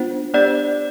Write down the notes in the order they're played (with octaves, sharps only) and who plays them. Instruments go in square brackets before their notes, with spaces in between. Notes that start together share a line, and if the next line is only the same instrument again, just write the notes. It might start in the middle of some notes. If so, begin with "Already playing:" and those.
Already playing: [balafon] B3 D4 F4 C5
[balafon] B3 D4 G4 C5 [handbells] D5